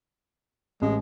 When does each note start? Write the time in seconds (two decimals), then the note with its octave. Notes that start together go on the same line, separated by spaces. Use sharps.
0.82 A1 G#3